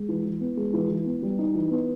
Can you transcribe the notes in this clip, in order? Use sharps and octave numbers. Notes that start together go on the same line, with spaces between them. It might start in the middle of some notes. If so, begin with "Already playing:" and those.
Already playing: G#3
E3
E3
B3
G#3
E3
E3
B3
G3
D#4
E3
B3